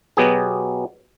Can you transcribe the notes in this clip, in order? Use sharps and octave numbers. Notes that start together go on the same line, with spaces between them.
B2 F#3 B3 G4 G#4